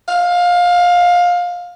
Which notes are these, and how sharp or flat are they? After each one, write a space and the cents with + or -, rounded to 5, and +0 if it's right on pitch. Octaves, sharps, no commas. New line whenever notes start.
F5 +20